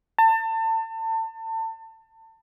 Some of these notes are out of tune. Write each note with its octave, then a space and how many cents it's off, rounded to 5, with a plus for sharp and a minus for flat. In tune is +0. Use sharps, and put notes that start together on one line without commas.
A5 +30